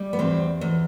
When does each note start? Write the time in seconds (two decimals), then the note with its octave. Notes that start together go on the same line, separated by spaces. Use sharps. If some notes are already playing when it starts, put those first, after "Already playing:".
Already playing: G3
0.13 B3
0.19 E2 C4
0.61 E2